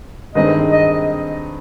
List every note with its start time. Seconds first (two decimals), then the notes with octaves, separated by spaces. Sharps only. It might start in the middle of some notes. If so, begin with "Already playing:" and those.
0.35 G2 D#3 G#3 C4 D#4 D#5
0.72 D#5